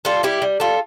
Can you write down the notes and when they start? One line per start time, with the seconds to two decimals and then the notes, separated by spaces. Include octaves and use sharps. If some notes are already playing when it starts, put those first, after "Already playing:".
0.05 G3 F4 A4
0.23 G3 E4 G4
0.42 G3
0.60 G3 F4 A4